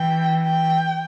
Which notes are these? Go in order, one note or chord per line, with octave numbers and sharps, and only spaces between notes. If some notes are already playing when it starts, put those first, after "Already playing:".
Already playing: E3 G5
G5